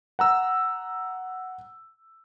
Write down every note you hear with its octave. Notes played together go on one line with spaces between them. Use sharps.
F#5 A#5 E6